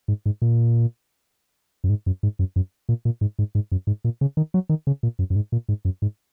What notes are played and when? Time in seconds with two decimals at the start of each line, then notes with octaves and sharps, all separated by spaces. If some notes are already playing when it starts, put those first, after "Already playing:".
0.08 G#2
0.26 G#2
0.42 A#2
1.84 F#2
1.89 G#2
2.06 F#2
2.23 G#2
2.39 F#2
2.56 F#2
2.89 A#2
3.05 A#2
3.21 G#2
3.39 G#2
3.55 G#2
3.72 F#2
3.87 G#2
4.04 A#2
4.21 C#3
4.37 D#3
4.54 F#3
4.69 D#3
4.87 C#3
5.03 A#2
5.19 F#2
5.30 F#2
5.36 G#2
5.52 A#2
5.69 G#2
5.85 F#2
6.02 G#2